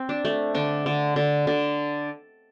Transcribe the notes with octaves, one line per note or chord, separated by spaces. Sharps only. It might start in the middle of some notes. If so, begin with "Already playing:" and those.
Already playing: C4
D4
A3
D3 D4
D3
D3
D3